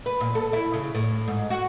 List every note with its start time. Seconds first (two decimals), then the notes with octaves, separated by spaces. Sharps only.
0.06 B4
0.21 A#2
0.35 A4
0.53 E4
0.73 C#3
0.95 A2
1.27 G#2
1.50 F#4